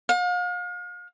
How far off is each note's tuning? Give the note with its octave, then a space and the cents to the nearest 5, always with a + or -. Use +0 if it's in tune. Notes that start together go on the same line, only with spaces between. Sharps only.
F5 +40